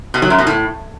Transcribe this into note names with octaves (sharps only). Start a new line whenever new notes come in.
B2
F#3
F#2
B2
A2